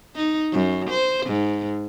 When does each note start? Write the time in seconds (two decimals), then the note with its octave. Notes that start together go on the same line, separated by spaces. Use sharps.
0.15 D#4
0.53 F#2
0.90 C5
1.26 G#2